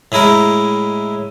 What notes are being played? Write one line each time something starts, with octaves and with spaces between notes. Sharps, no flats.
A2 G#3 E4 A#4